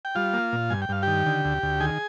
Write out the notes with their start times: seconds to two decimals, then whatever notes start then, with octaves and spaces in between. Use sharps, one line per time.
0.05 G5
0.15 G3 F4 F5
0.34 A#3
0.53 A#2
0.70 G2 G#5
0.82 G5
0.89 G2 F5
1.03 D#3 G4 G5
1.26 D3
1.45 D2
1.63 D2
1.80 D#3 G#4 G#5